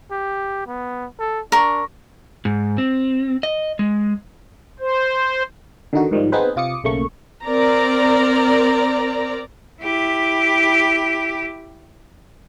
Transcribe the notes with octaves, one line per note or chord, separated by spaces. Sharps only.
G4
B3
A4
D4 A#4 C#6
G#2
C4
D#5
G#3
C5
D3 D#3 D#4 F#4
G#2 D#3 F3 G3
B3 C4 D#4 G#4 B4 C5
C3 F4 D6 D#6 C#7
B1 C#3 A3 A#3 C#6
C4 A#4 D5 A#5
E4 G4